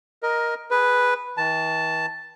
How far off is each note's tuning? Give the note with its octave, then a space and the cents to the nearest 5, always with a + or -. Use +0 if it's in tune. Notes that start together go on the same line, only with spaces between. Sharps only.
A#4 +10 D#5 +0
G#4 +0 B4 +0
E3 -45 A5 +0